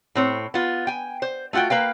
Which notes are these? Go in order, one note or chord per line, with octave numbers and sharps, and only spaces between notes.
A2 C4 C#5
B3 F4
G5 G#5
C5
A3 F4 F#4 F#5 G5
A#3 B4 F5 G5